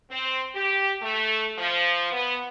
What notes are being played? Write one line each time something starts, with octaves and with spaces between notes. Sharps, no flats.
C4
G4
A3
F3
B3